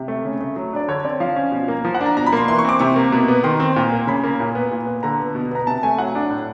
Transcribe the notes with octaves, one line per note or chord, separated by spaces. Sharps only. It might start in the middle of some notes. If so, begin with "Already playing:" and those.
Already playing: C3
A3
C#3
A3
F#3
D4 D5
D3 C#5
C4 D5
F3 F5
C#4
B2
A#3
F3
F#5
D4
A#5
B2 A#5
B5
A#3 C6
E3 C6
C#6
C4 D6
C3 C#6
A#3
B2
B3
D#3 C6
C4
A#2
A#3
C#3 B5
A#3
A#2
B3
A#2
B3
D3 A#5
B3
B2
B3 A#5
C3 A5
A3 G#5
F#3 F#5
D4
A2